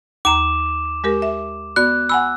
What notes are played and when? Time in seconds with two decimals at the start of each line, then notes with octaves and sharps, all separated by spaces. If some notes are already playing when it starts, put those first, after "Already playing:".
0.25 D#2 A#5 D6 E7
1.04 G#3 G4 A#4
1.22 E5
1.76 B3 F#4 D5 F#6
2.09 F#5 G#5 B5 E6